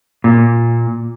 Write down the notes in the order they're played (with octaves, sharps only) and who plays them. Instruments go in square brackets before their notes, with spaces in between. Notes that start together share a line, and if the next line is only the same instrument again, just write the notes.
[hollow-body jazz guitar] A#2